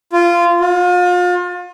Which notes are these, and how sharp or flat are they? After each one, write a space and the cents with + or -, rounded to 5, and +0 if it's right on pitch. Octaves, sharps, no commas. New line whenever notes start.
F4 -15
F4 +35